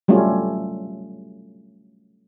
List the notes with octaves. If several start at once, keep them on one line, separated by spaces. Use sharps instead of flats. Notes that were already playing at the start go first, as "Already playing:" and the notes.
F#3 G3 A3 C#4 F4